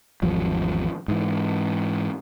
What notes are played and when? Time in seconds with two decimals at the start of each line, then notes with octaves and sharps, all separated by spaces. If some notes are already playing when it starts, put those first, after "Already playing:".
0.22 G#1 E2 F3 G3
1.08 G#2 E3